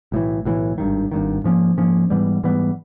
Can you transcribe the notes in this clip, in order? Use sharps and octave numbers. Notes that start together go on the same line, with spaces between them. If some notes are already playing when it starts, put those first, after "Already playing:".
B1 A2 E3
B1 A2 E3
G#1 G2 D#3
G#1 G2 D#3
G#2 F3 A#3 C#4
G#2 F3 A#3 C#4
G#2 E3 G3 B3
G#2 E3 G3 B3